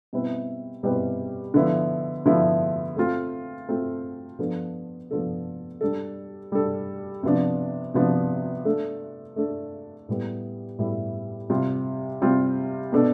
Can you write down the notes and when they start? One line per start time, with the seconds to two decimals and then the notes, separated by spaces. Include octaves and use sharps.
0.13 B2 G3 C4 E4 B4
0.83 B2 G3 C4 E4 B4
1.54 D3 F3 B3 E4
2.26 D3 F3 B3 E4
2.96 A3 C4 F4
3.69 A3 C4 F4
4.39 F3 B3 D4 A4
5.11 F3 B3 D4 A4
5.81 G3 D4 A4
6.52 G3 D4 A4
7.23 C3 F3 B3 D4
7.94 C3 F3 B3 D4
8.65 A3 D4 A4
9.36 A3 D4 A4
10.09 A2 G3 B3 E4
10.79 A2 G3 B3 E4
11.50 C3 G3 C4 F4
12.22 C3 G3 C4 F4
12.92 B2 B3 D4 A4